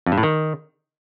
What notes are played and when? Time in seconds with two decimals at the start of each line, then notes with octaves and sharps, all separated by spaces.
0.06 F2
0.12 G2
0.18 A2
0.23 D#3